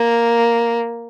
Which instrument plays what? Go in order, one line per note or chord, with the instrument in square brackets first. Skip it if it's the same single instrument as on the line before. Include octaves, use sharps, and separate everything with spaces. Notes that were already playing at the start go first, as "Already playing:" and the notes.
Already playing: [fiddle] A#3